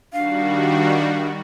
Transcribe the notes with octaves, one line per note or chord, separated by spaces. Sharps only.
D#3 G3 D4 F#4 F5